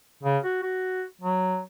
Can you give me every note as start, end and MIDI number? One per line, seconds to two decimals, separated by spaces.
0.23 0.38 49
0.44 0.58 66
0.62 1.04 66
1.21 1.60 54